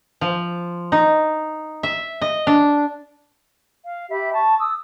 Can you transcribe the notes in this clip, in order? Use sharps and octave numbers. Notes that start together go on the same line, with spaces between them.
F3
D#4
E5
D#5
D4
F5
G4 E5 B5
A5 C#6
D#6 E6